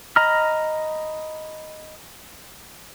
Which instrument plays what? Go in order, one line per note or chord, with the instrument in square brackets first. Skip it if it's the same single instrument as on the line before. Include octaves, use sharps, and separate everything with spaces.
[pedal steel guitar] D#5 A#5 B5 F6